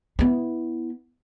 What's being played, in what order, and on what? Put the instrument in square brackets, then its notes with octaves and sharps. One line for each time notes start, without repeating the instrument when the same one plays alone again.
[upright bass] B3 E4